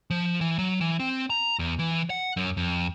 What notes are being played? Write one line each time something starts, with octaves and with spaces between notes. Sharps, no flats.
F3
E3
F#3
E3
C4
A#5
E2
E3
F#5
F#2
F2